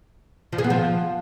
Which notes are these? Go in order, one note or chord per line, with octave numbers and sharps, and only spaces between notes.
F3
G#4
B3
F3